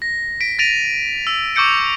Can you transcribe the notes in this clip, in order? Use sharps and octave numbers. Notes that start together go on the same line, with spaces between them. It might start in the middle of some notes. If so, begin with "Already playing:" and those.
A#6
B6 D7
A6 A#6 D7 D#7 F7
E6
C#6 D6 E6 G6 C#7 D7